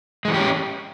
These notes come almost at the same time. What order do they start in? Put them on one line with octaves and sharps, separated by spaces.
G#3 E3 F#4 G4 C#4